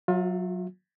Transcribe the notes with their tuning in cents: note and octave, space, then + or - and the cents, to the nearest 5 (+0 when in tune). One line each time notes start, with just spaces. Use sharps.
F#3 -10 F4 +35 E5 +0